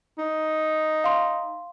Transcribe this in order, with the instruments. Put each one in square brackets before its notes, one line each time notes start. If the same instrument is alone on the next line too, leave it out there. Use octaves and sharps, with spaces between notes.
[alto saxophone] D#4
[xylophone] F5 C6